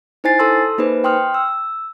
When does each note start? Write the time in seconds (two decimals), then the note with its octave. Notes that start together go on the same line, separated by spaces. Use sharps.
0.24 D#4 E4 C5 G#5 A6 C7
0.39 A4 A5 C6 E6
0.78 A#3 D#4 G#4 B4 C5
1.04 G5 C6 D#6 F6
1.34 E6